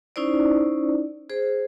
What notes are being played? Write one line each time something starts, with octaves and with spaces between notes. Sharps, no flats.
C#4 D#4 E4 C5 D5
G#4 C5